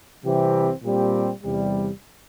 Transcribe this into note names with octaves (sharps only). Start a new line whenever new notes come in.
C3 E3 G3 C4 G4
A#2 G3 C4 G4
E2 C3 G3